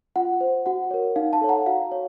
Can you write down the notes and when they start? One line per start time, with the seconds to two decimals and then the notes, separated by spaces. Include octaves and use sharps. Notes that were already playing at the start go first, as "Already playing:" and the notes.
0.16 F4 F#5
0.41 C5
0.66 F#4 F#5
0.91 A#4 C#5
1.16 D#4 F5
1.33 F5 A5
1.41 A4 C#5
1.49 F#5 A#5
1.66 F#4 F5
1.92 C#5